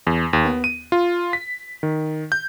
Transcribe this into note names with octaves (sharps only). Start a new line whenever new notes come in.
E2
D#2
B3
D#7
F4
B6
D#3
G6